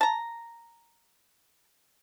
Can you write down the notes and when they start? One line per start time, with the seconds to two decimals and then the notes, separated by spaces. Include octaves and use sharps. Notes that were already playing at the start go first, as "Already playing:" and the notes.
0.01 A5 A#5